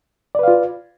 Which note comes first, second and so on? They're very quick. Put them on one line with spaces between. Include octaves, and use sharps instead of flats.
D5 B4 F5 F4